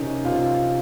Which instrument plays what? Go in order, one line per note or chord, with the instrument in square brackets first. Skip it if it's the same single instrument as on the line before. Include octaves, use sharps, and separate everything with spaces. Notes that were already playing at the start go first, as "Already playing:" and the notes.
Already playing: [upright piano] C3 D#3 C#4 D#4
C3 F4